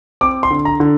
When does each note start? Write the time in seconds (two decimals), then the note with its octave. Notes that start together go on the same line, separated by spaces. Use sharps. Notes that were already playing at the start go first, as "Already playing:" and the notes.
0.21 C4 D6
0.43 C6
0.51 D3
0.65 A#5
0.80 D3